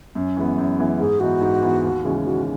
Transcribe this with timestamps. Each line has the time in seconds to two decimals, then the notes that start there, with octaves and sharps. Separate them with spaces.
0.15 F#2 C#4
0.37 E3 G#3 B3
0.58 F#2
0.78 E3 G#3 B3
0.99 G#2 G#4
1.20 E3 B3 D#4 F#4
1.41 G#2
1.63 E3 B3 D#4
1.83 D#2
2.04 C#3 E3 G#3 C#4
2.25 D#2 F#4